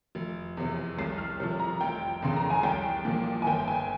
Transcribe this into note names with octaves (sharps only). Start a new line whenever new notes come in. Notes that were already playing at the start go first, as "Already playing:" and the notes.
F1
E2 C3
C2 C7
F6
C3 F3
A#5
F1 G5
E2 C#3 C6
A#5
G#5
C2 G5
A#2 F3
G#5
G1 G5
G#5